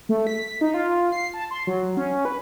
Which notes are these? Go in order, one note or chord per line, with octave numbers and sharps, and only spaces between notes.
A3
B6
D#4
F4
C7
A5
C6
F#3
C#4
B4